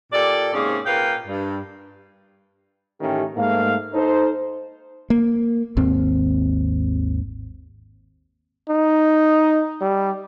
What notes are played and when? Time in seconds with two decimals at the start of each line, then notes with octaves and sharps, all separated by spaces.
0.12 A#2 G4 A4 D5
0.53 G#2 C3 A#3 C#4 G#4
0.86 A#2 A#4 B4 F5 G5
1.26 G2
3.01 A1 D#3 A3 C#4 G4
3.36 G#2 A3 A#3 F5
3.94 D#4 A4 C5
5.10 A#3
5.77 G#1 D#2 C4
8.69 D#4
9.81 G3